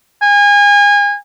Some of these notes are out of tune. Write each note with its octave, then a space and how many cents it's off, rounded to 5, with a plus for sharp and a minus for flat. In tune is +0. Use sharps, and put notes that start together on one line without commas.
G#5 -30